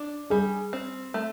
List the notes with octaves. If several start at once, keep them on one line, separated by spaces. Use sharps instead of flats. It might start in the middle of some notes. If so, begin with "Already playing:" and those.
Already playing: D4
G3 G#4
C4
A3